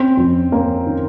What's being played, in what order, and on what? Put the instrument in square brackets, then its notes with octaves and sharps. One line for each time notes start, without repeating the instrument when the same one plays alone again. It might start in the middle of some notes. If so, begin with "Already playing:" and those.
Already playing: [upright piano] C4 C5 [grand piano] C#4
[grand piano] F2
[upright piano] A#3 A#4 [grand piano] C#4
[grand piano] D#3